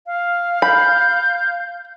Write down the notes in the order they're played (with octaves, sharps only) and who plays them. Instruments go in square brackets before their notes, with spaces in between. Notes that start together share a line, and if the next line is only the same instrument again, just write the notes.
[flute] F5
[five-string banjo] B5 [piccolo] G6